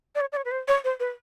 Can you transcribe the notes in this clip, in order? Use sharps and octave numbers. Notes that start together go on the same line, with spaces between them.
D5
C#5
D5
C#5
B4
C5
C#5
C5
B4